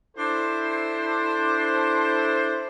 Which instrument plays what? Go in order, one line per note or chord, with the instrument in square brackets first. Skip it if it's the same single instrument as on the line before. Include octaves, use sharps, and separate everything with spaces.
[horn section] D4 E4 A4 C5